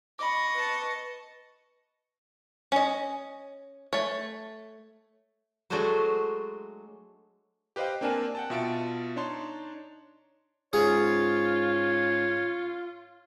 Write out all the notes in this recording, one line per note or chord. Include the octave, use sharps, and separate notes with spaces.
D#5 B5 C#6 D6
B4 A5
C#4 D#5
A3 C#5
F#3 G#3 A3 D4 F#4 C5
G4 B4 C5 D#5 F5 G5
A#3 C4 D4 A#4 G#5 A5
F#5 G5 A5
B2 F4 E5 A5 C#7 D7
D4 D#4 C#5 A5 C6
G#2 C#4 F4 G#4 C#5